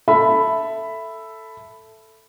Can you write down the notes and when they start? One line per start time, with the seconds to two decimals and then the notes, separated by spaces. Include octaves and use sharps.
0.08 A4 E5 B5